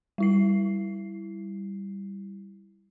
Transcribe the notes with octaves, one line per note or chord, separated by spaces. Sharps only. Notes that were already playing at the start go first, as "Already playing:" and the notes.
G3 E4 C7